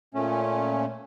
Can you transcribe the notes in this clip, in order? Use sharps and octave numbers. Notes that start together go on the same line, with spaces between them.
A#2 A3 C#4